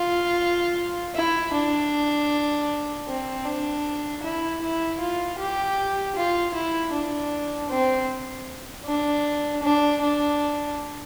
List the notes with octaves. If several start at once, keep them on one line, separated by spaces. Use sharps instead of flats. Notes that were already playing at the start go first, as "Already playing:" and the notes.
Already playing: F4
E4
D4
C4
D4
E4
E4
F4
G4
F4
E4
D4
C4
D4
D4
D4